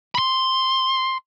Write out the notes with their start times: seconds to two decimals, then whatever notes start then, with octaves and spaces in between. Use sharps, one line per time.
0.15 B5 C6